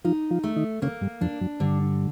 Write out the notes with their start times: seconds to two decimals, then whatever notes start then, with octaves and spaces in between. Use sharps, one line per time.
0.04 F3 D#4 F4
0.31 F3 F4
0.43 A3
0.56 D#3 D#4
0.82 C#3 A#3 C#4
1.01 G2 G3
1.21 F2 F3 D4
1.41 F#2 F#3
1.60 G2 D3 G3